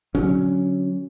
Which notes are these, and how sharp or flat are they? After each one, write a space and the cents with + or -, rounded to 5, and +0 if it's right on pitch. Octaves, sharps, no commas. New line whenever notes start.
D3 -15 F#3 +0 C#4 +0